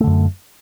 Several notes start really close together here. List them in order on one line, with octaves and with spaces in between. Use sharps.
A3 D3 F#2